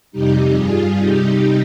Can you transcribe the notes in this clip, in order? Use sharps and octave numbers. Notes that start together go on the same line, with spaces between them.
F2 C3 G3 D#4 G4
G2 G3 F4 G#4
C3 G3 D#4 G4